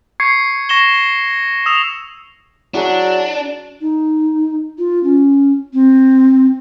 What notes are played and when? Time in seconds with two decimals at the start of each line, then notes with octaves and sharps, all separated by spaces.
0.20 C#6 G#6 C7 C#7
0.69 C#6 A#6 E7 G7
1.66 D#6 E6 E7 F7
2.74 F#3 D4 E4 F#4 G#4
3.81 D#4
4.78 F4
5.04 C#4
5.73 C4